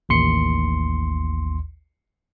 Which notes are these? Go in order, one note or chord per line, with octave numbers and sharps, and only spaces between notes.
A1 D#2 C6 C#7